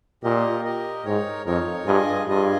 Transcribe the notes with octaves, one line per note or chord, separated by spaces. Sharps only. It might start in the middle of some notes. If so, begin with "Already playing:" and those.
A#2 G4 A#4 D#5
G4 A#4 D#5
G#2 D#4 A#4 C#5
F2 D#4 A#4 C#5
G2 F4 G#4 D#5 G#5
G2 F4 G#4 D#5 G#5